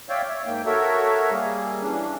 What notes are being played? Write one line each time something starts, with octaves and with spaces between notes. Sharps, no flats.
C#5 D5 E5 F5 G5
C#5 E5
G#2 A#3 G5
F#4 A4 A#4 C#5 E5
G3 A#3 G#4
E3 C#4 D4